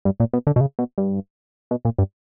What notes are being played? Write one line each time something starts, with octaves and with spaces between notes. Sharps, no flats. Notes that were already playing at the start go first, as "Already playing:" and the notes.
G2
A#2
B2
D3
B2
C#3
B2
G2
B2
A#2
G2